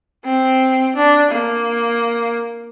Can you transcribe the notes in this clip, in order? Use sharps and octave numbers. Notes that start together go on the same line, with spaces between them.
C4
D4
A#3